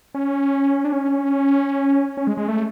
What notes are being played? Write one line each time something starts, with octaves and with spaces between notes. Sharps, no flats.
C#4
D4
C#4
C#4
G#3
G#3
A3